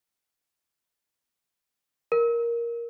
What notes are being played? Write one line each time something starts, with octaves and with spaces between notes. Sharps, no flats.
A#4